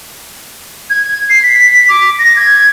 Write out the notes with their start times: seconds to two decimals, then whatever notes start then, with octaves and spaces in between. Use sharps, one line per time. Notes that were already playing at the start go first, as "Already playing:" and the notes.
0.90 G#6
1.30 C7
1.43 B6
1.89 D6
2.19 A#6
2.36 G#6